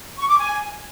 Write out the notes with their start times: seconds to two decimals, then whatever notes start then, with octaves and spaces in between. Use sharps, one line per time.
0.18 C#6
0.29 D6
0.39 G#5